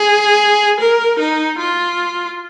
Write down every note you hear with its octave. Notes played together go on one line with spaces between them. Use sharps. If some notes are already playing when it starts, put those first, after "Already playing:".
Already playing: G#4
A#4
D#4
F4